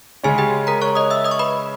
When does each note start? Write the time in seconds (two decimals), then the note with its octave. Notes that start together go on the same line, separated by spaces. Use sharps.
0.23 C#3 G#3 C#4 G#4 G#5
0.38 G4 G5
0.67 A#4 A#5
0.82 C#5 C#6
0.95 D#5 D#6
1.10 E5 E6
1.24 D#5 D#6
1.31 C#6
1.39 B4 B5